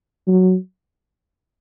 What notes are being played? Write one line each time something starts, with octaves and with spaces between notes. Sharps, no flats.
F#3